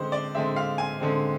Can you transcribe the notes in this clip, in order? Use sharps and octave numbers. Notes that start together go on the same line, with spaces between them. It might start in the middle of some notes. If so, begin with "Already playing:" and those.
Already playing: D3 G#3 C4 C5
D5
D3 G#3 C4 E5
F5
G#5
D3 G#3 C4